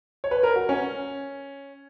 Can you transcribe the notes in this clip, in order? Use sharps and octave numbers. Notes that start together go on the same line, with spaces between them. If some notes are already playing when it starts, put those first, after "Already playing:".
C#5
B4
A#4
F#4
C#4